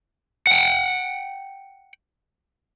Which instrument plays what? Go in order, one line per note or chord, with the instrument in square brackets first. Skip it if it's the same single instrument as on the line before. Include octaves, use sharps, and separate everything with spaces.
[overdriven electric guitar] F#5 G5